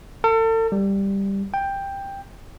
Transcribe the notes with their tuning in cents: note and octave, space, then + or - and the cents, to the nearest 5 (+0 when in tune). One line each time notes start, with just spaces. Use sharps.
A4 +40
G3 +5
G5 +10